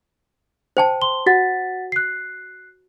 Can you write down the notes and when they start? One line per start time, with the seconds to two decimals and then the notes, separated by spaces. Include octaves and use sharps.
0.77 C5 G5 A5
1.02 C6 G7
1.26 F#4 F#5 A6 B6
1.92 F#6 C7